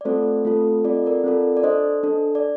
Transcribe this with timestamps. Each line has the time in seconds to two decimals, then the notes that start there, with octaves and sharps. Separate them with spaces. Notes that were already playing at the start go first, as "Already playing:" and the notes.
0.01 D5
0.05 A3 C4 F4 A4 C5
0.45 A3 C4 F4 A4
0.84 C4 F4 A4 D5
0.95 D#5
1.06 A#4 D5
1.24 C4 F4 A4
1.57 D5
1.64 D4 A4 C5 D#5
2.03 D4 A4
2.35 D5